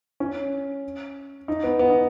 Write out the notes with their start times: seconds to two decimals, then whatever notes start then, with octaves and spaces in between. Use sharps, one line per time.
0.20 C#4
1.48 D#4
1.64 B3
1.79 B3
1.90 D#4